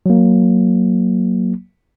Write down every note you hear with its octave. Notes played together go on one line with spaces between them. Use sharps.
F#3 A#3